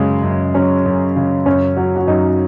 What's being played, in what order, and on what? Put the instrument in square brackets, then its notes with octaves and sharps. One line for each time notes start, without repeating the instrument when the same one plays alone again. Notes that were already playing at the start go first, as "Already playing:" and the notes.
Already playing: [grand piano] F#2 C#3 [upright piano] G#3
[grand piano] F#2
[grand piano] F#3 [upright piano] C#4
[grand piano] F#2
C#3
[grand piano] F#2 [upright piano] C#4
[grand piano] F#3 [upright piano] F#4
[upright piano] F#4
[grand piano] F#2 [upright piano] D#4